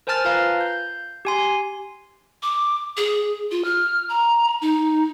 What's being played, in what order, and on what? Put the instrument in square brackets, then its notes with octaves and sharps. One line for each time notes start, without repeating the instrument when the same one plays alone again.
[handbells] A#4 C5 G#5 A5 F6 A6
F4 B4 F5 A#5
G6
G4 G#5 C6
[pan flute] D6
G#4
F4
F6
A#5
D#4